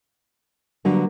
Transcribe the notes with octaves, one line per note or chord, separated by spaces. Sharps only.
G2 D3 F#3 A#3